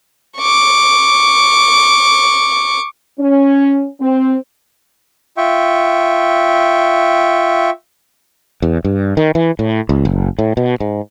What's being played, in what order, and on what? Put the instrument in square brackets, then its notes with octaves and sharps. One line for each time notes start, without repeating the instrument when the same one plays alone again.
[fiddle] C#6 D6
[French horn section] C#4
C4
[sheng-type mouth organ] F4 E5 G5 C#6
[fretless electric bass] E2
G2
D#3
E3
A2
C#2
F#1
A2
B2
G#2